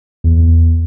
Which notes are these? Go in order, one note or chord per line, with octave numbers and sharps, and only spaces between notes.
E2